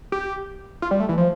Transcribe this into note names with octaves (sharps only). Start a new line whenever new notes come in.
G4
F4
G3
A3
E3
F3